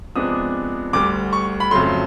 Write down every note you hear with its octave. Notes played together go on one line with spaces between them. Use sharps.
C3 F3 G#3 B3 D4 D#6
D2 D3 G3 D6
C#6
B5
F2 C#3 F#3 A3 C6